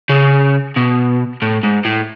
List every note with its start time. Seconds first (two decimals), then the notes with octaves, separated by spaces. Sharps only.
0.09 C#3
0.76 B2
1.42 A2
1.64 G#2
1.85 A2